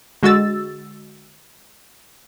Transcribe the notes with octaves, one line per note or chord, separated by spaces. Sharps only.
D3 G#3 F#4 D#5 E6 A6